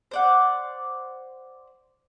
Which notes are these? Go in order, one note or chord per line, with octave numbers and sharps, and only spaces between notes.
C5 D5 F#5